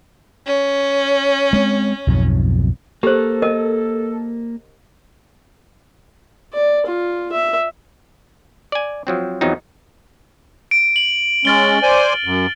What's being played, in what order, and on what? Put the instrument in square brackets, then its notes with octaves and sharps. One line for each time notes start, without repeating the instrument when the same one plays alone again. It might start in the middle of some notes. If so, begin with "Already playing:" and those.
[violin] C#4
[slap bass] G#3 C4
B1 F2 G#2
[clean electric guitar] A#3 [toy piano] G4 C5 [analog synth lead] A4
[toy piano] A#4 D#5
[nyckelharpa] D5
F4
E5
[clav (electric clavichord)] D5 G#5
F3 F#3 C4
E2 F3 F#3 B3 C4 D#4
[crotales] D7
F#7
[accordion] G#3 C#4 [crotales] F6 A6 G7
[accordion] C5 D5 G#5
F#2